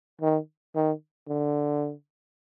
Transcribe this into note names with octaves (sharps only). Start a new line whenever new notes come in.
D#3
D#3
D3